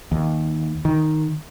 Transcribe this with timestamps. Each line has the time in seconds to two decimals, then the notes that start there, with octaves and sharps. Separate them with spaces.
0.12 D#2
0.85 D#3